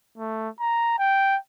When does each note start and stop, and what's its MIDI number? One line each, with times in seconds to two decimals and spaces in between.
0.18 0.49 57
0.60 0.94 82
0.99 1.37 79